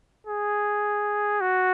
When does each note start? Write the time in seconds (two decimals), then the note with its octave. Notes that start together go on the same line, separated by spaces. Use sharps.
0.27 G#4
1.41 F#4